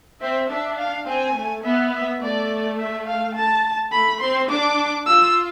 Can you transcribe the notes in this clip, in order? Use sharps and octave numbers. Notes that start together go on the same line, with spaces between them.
C4 E5
D4 E5
F5
C4 G#5
A3
B3 E5
E5
A3 D5
E5
F5
A5
A3 B5
C4 C6
D4 D6
F4 E6